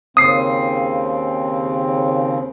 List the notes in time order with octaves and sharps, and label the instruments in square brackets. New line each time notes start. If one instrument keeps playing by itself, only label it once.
[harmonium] D#2 C#3 C4 [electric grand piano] D#6 C7